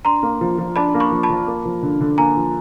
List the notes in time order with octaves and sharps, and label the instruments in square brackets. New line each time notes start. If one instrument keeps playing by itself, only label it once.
[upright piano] D4 [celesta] A#5 C6
[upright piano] A#3
F3
F3
[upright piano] D4 [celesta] A5 B5
[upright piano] A#3
[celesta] B5 C#6
[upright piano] F3
[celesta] A5 B5
[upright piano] F3
A#3
F3
D3
D3
[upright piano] A#3 [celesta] G#5 A#5
[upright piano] F3